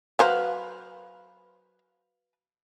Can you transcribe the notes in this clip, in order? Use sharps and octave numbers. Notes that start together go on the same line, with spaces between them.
F#3 B4 C5 F5 A#5